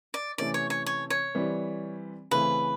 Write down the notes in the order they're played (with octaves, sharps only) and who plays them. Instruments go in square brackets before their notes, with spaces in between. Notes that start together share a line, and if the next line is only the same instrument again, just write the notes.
[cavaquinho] D5
[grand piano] C3 E3 A3 C#4 [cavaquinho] D5
[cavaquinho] C#5
C#5
C#5
C#5
[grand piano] E3 G3 C4
[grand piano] C#3 E3 A3 C4 [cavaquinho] B4